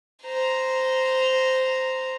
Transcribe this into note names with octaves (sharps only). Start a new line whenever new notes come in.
C5 A#5